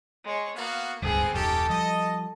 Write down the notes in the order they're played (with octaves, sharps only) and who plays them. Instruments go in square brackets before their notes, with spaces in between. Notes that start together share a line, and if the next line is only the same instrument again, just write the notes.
[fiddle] G#3 C#5
[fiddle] A#3 [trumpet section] B3 F#4 F5
[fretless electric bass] D1 C#2 G2 [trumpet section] B3 C4 [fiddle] G#4
[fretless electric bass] D#1 F#2 [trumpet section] C#4 D#4 G4 [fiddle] A4
[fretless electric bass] F3 G3 [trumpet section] D#5